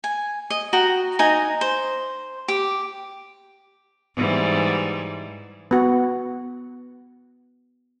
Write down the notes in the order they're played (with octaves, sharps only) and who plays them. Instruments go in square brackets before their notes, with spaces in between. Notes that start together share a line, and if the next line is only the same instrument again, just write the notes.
[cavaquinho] G#5
D#5
F#4 G5 A#5
D#4 G#5 A#5
C5
G4
[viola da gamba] G#2 E3 G3
[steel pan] B3 F#4